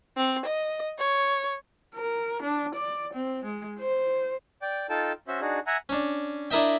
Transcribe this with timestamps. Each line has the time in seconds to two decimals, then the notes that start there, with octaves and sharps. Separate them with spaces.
0.17 C4
0.46 D#5
0.98 C#5
1.95 A#4
2.43 D4
2.75 D5
3.14 C4
3.45 G#3
3.80 C5
4.62 D5 G5
4.90 D#4 F4 A4 G5 A5
5.28 C#4 F#4 C5 E5
5.41 D4 D#4 F#4 G#4
5.67 E5 F#5 G#5 A#5
5.89 C#4 D4
6.51 D4 E4 A#4 D#5 E5 G5